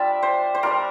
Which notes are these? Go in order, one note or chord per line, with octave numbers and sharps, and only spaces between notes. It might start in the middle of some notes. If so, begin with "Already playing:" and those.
Already playing: G3 D4 F4 D5 E5
C5
C5
G3 D4 F4 A#4